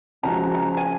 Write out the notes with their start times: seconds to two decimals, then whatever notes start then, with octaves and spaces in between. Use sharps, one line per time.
0.23 C#3 F3 G#3 C#4 F#4 A#5
0.55 A#5
0.77 G#5